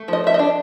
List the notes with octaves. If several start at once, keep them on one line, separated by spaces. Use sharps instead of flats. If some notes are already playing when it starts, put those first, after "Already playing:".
Already playing: A3
F3 D#5
F3 E5
D#5
D4